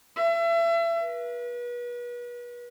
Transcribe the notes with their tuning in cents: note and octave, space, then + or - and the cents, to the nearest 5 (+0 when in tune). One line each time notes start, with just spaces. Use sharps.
E5 +35
B4 -35